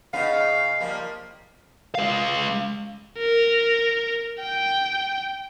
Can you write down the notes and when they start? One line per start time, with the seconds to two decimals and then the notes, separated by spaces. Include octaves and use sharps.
0.13 C#3 B3 D#4 F5
0.80 F3 G3 A#3
1.95 G#3 F5
3.19 A#4
4.41 G5